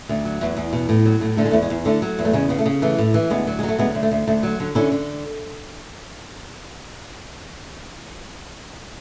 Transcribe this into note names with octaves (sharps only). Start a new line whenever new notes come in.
D2
F#3
E2
E2
B2
A2
F#3
A2
D3 A3
G#3
E2 A3
G#3
E2
D3 A3
F#3
E2
A3
C#3 G#3
C#3 B3
A3
C#3
E3 A3
A2
E3
D2 G#3 B3
F#3
F#3 G#3
A3
D2 G#3 B3
D2
A3
D2
D2 A3
F#3
D3
D3 C#4 E4
D3